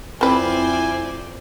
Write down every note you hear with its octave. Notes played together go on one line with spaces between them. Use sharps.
F2 C4 E4 B4 C5 D5 G#5